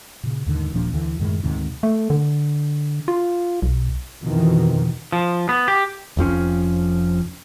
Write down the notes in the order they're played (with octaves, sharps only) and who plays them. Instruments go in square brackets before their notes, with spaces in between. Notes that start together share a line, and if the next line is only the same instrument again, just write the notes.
[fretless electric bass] A#2 C#3
D#2 G#2 D3 D#3
D#1 A#2 F3 D4
D2 D3 E3
F#2 A2 D#3 G#3
D2 G#2 C3 D#3
[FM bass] A3
D3
F4
B1
[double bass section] F2 B2 D#3 E3
[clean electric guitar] F3
B3
G4
[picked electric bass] F1 F2 F3 C#4